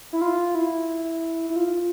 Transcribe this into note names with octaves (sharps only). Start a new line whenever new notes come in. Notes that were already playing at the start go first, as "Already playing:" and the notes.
E4
F4
E4
E4
F4